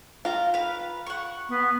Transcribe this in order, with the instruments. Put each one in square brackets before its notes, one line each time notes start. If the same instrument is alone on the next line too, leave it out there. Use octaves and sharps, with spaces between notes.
[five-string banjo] F4 [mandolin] F5 A#5
[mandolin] B4 F5
F#5 C#6
[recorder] B3